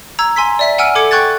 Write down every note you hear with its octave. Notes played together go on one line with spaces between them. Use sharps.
A#5 E6 G#6
G#5 C6 E6 B6
D5 E5 B6
F#5 G#5 E6 F6 D7 D#7
A4 D6 G#6 C#7
G5 C#6 F#6 G#6 A6